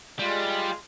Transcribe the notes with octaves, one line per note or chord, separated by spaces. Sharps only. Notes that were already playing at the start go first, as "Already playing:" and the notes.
G3 G#3 F4